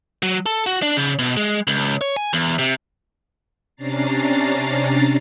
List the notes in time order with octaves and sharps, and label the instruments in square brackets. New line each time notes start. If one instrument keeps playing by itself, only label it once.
[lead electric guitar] F#3
A4
F#4
D4
C#3
B2
G#3
C#2
C#5
G#5
E2
C3
[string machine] C3 C#4 D4 A#5 A6 C7